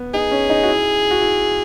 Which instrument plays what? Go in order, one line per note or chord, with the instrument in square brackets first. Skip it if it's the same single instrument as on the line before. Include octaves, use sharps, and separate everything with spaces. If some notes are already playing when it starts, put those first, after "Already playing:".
Already playing: [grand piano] B3
[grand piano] D#4 [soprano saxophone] G#4
[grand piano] C#4
D#4
F#4
E4
F#4
E4